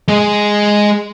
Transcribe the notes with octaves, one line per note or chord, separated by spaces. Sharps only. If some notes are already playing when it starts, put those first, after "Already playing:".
G#3 G#4